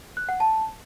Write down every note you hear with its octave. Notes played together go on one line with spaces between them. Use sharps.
F#6
F#5
A5